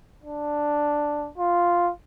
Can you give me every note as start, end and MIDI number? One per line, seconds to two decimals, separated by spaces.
0.24 1.30 62
1.38 1.91 65